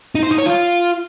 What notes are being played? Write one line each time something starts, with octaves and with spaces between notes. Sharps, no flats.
D#4
C5
D#4
C#5
F4